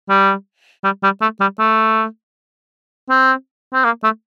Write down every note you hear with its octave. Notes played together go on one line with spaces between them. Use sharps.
G3
G3
G3
A3
G3
A3
C4
C4
A#3
A3